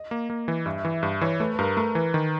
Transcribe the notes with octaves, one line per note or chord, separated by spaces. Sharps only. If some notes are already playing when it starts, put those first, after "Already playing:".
Already playing: D#5
A#3
A#3
E3
G2 E5
E5
E3
E5
G2
E3 C#5
A3 B4
B4
G2 A#4
A3 A#4
E3 B4
D#3